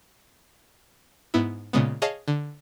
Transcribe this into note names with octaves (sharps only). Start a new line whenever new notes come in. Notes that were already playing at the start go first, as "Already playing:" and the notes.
G#2 B3 E4
A#2 C#3 G#3 B3
G#4 C#5 D#5 F5 A5
D3